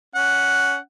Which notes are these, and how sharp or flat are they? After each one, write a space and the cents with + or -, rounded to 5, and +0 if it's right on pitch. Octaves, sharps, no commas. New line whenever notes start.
C#4 +20 F#5 +0